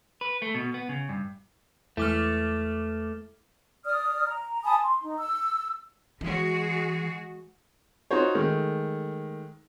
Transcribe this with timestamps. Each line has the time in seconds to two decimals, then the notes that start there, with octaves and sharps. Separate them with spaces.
0.21 B4
0.42 A3
0.54 B2
0.74 B3
0.89 C#3
1.09 G2
1.97 E2 G#3 A3 E4 D6 F6
3.85 D5 D#6 F6
4.28 A#5
4.64 G#5 A5 B5 D#6
4.82 C6
5.02 D#4
5.18 E6
6.21 E3 G#3 F#4 G#4
8.11 D#4 F4 F#4 C5 C#5
8.35 D#3 G#3 A3